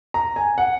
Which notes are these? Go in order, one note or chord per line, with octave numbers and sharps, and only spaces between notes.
A#5
G#5
F#5